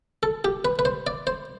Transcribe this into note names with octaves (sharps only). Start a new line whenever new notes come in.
A4
G4
B4
B4
C5
D5
C5